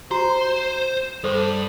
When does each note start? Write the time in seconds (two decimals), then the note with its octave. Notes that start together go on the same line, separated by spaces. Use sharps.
0.11 F#4 C5 A#5
1.24 G2 A4 C5 D6